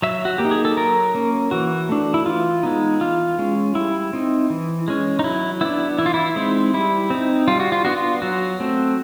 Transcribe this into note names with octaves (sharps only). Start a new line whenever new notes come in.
F#3 E5
F#4
A#3 G4
D#4
G#4
A4
F#3 A#4
A#3 C#4
E3 F#4
A3 D4
E4
E3 F4
G#3 B3 D#4
E3 F4
G#3 C#4
G3 E4
C4 D#4
E3
G#3 C#4
D#4
F#3 E4
B3 D4 E4
E3 E4
F4
E4
G#3 C4 D#4
G3 E4
C4 D#4
G3 F4
F#4
F4
B3 D4 F#4
F4
F#3 F#4
A3 C4